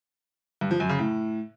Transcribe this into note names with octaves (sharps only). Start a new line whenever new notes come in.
G2
F3
F#2
C#3
A2